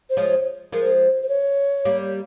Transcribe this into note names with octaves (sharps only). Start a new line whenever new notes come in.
C5
F3 G#3 C#5
F3 G#3 A#4
C5
C#5
G3 A#3